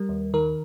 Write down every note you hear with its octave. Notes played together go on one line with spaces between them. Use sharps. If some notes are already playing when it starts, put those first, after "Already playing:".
Already playing: G3 A#4
D#2
D#3 A#4